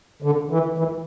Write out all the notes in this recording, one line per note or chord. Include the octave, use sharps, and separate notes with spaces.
D3
E3
E3